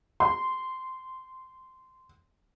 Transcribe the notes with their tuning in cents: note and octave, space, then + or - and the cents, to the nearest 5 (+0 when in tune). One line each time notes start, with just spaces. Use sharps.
C6 -10